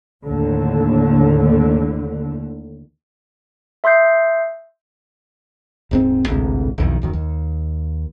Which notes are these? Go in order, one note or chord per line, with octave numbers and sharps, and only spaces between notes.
D#2 A2 D3
E5 C6 D#6 G6 C7
D#1 G#2 C4
A1 D2 G#2 C3
E1 B1 F2 D#3
D#1 F#2 D#3
D#2